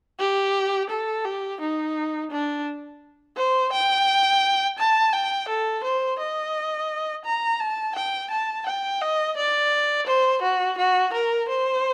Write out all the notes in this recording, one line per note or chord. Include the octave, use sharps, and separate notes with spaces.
G4
A4
G4
D#4
D4
C5
G5
A5
G5
A4
C5
D#5
A#5
A5
G5
A5
G5
D#5
D5
C5
F#4
F#4
A#4
C5